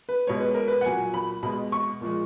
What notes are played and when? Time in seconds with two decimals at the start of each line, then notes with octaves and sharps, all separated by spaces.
0.09 B4
0.27 B2 G#3 C#5
0.40 B4
0.55 A#4
0.68 B4
0.81 F#5
0.85 A#2 F#3 G#5
1.14 B5
1.43 B2 G#3 B5
1.72 C#6
2.01 A#2 F3 G#3